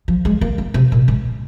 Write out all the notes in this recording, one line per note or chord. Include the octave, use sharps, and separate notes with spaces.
F3
G#3
A#3
A#3
C3
A#2
G#2